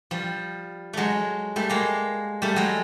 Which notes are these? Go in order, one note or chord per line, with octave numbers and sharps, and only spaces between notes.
F3 G3
F#3 G#3 A3
G3 A3
G#3 A#3
G3 A3
F#3 G#3